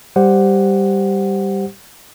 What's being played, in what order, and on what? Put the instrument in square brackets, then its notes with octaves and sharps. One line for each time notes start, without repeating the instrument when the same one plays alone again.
[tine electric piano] G3 G4 C5 F#5